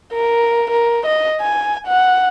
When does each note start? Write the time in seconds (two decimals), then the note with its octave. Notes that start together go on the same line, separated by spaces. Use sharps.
0.13 A#4
0.70 A#4
1.06 D#5
1.41 G#5
1.87 F#5